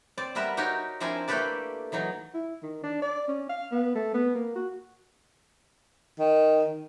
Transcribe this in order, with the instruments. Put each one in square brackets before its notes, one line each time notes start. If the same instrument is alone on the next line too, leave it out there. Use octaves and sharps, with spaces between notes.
[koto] C4 D5
G3 B3 A#4 B4 E5
D#4 F#4 G4 A#4 C#5
F3 C4 D4 E4 A#4 G#5
A3 A#3 G4 A4 B4 D5
E3 F#3 D#4 C#5
[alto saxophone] E4
D#3
D4
D5
C#4
F5
B3
A3
B3
A#3
F#4
[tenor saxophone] D#3